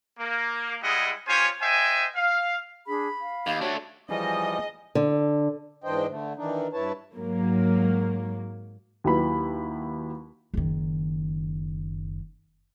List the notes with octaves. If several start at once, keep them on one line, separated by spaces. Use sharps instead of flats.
A#3
G3 G#3 E4 G#4 D#5 F#5
C#4 F4 G4 C5 C#5 G#5
C5 D#5 E5 G5 G#5
F5
D4 G#4 B5
F5
D#2 G4 F5
A3 D4 F#4 C#5
E3 F3 G3 D#4 G#4 D#5
D3
G#2 E3 D4 C5 D#5 G5
D3 A3
D#3 E3 D4 D#4
G2 E4 B4 C#5 A5
G#2 F#3 A#3
D#2 F#3 E4 B4 B5
F#1 D#3